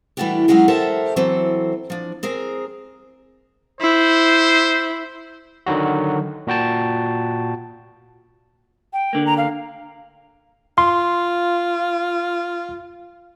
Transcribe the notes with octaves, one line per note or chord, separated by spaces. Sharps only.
E3 G3 A3 D4 F#4 G4
F#3 G#3 C#4 D#4 F#4 G#4
G4 A4 A#4 C5 E5 A5
E3 F#3 C4 A4
F3 D4
C4 G#4 A#4
E4 C5
D3 D#3 F#3 F#4
A#2 F#4 G5 A5
G5
D3 A#3
A#5
F5
F4 C6